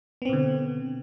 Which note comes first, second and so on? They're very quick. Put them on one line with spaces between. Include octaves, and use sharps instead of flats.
B3 C4 B2 D3